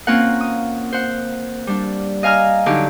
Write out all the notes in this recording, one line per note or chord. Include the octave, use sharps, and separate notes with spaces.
A#3 C4 C#4 F4 A#4 F#5
D#6
C5 F#5
G3 D4
D#5 F5 G#5 A#5 F6
D3 F#3 D#4 G4